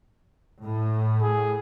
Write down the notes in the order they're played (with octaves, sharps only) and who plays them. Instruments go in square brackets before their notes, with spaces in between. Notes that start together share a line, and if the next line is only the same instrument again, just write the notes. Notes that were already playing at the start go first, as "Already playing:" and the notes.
[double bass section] A2
[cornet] G#4